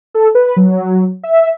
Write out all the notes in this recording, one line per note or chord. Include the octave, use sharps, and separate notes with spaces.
A4
B4
F#3
E5